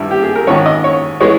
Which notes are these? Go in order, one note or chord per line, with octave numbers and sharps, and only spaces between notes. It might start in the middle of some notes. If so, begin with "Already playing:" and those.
Already playing: G#1 G2 G3 E4
G4
G#4
A#4
G#1 G#2 D#3 C#5
D#5
C#5
E3 G#3 B3 C#5